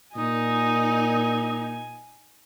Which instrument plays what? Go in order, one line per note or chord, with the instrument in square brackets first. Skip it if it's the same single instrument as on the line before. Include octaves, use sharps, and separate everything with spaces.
[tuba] A#2 [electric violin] D#4 [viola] G#5 [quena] D#6